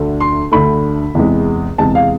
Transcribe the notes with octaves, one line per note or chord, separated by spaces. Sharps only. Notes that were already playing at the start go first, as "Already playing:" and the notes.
Already playing: D2 D3 A3
C6
D2 D3 A3 B5
E2 C3 G#3
E2 C3 G#3 A5
F5